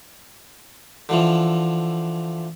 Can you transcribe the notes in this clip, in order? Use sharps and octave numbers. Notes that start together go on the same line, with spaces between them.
D3 E3 F3